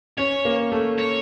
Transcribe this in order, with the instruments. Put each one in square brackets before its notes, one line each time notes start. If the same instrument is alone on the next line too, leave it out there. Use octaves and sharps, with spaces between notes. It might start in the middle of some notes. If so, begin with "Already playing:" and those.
[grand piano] C#4 [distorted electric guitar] C#5
[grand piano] A#3
A3
[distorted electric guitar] C#5